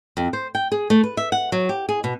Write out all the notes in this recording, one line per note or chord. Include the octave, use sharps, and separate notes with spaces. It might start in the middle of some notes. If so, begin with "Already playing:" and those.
F2
C5
G5
G#4
A3
B4
E5
F#5
F#3
G4
G#4
B2